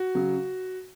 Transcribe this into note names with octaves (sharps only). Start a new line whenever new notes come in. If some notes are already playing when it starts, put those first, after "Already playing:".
Already playing: F#4
C#3 F#3